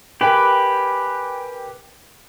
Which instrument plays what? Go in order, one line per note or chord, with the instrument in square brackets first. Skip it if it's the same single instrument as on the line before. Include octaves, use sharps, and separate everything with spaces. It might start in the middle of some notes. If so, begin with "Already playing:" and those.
[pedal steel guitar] G4 B4 [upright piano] A#4 G5 G#5